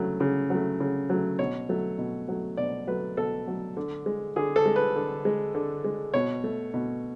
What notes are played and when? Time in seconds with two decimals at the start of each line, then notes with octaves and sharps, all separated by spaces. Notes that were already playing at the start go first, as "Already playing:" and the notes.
Already playing: C#3 F#3 A3
0.20 C#3
0.50 F#3 A3
0.80 C#3
1.09 F#3 A3
1.39 B2 C#5
1.69 F#3 A3
1.99 B2
2.28 F#3 A3
2.57 B2 D5
2.87 F#3 A3 B4
3.17 B2 A4
3.47 F#3 A3
3.77 D3
4.06 G#3
4.36 D3 G#4
4.56 A4
4.66 G#3
4.76 B4
4.96 D3
5.25 G#3
5.55 D3
5.84 G#3
6.14 B2 C#5
6.44 A3
6.74 B2